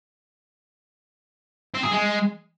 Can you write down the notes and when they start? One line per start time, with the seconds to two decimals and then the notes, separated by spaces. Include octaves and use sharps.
1.74 C4
1.83 G#4
1.92 G#3